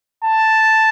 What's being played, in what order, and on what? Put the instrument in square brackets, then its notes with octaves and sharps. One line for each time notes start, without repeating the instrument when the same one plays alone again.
[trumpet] A5